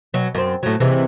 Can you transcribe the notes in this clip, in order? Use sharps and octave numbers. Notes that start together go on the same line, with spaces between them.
B2 F#3
F#2 C4
A2 F#3
C3 E3 G#3